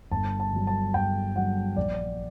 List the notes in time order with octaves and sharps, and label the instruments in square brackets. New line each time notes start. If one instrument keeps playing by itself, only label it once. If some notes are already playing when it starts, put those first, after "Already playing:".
[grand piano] G1 A5
A5
G2 F#3
A5
G1 G5
G2 F#3 F#5
A#1 D5